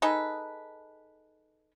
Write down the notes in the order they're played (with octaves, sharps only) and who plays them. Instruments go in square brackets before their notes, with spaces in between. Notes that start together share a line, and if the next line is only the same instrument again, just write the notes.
[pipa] D#4 G#4 A4 B4